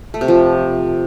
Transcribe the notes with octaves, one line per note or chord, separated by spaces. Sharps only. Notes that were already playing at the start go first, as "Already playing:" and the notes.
A3
C3
F3